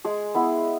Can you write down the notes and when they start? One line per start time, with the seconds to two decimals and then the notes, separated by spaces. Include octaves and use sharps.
0.05 G#3 G#4
0.34 B3 E4